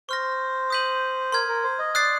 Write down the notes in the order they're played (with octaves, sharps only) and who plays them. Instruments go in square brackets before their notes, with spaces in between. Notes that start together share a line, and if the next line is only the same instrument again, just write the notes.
[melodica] C5 [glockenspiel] C#6 F6 A#6
[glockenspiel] D#6 G6 B6 D#7 F#7
[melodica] A#4 [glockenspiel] C6 F6 G#6
[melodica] A#4
C5
D#5
[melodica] D5 [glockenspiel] D#6 F#6 A6 C7